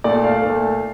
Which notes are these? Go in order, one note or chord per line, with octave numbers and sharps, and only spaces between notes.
A#2 A3 D5
F5
A#2 A3